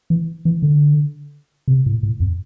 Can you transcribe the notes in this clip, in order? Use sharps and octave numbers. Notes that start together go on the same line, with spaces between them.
E3
E3
D3
C3
A2
A2
F2